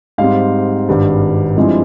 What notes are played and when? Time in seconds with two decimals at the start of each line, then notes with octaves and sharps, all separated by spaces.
0.18 G#2 G3 C4 F5
0.88 G#1 G2 G3
1.57 G2 F3 G#3 C4 E4